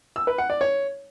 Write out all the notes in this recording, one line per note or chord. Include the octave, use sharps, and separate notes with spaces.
E6
B4
F#5
D5
C#5